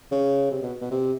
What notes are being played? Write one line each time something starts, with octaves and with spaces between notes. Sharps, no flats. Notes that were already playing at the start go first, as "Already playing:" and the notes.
C#3
C3
B2
B2
C3